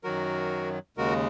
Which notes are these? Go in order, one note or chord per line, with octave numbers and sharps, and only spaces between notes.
F#2 D#3 F#3 F#4 A#4
D#2 C#3 G#3 F#4 A#4